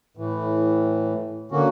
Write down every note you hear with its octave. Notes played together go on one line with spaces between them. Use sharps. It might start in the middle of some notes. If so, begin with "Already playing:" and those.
A2 E3
D3 A#3 C#4 F#4